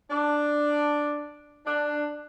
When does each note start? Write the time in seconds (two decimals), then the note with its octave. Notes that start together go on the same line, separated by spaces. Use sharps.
0.11 D4
1.66 D4